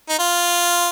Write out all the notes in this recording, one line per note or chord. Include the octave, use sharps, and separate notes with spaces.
D#4
F4